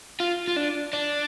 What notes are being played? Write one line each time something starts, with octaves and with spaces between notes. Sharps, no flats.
F4
F4
D4
D4